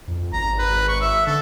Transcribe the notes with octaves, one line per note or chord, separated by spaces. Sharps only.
F2
G#1 A#5
B4
C#6
E5
D3 A4